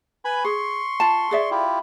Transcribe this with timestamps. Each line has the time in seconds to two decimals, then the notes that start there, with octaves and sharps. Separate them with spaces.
0.25 B4 G#5 B5
0.44 G#4 C6 C#6
1.00 F4 A5
1.31 G#4 D5 E5
1.51 E4 F4 G4